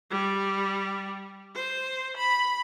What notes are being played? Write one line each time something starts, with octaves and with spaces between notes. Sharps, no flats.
G3
C5
B5